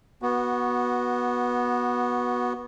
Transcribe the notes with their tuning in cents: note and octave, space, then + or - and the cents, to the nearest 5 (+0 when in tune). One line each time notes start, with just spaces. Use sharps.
B3 -15 F#4 +0